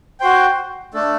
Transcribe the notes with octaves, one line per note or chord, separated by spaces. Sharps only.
F#4 C5 G5
A3 D4 A4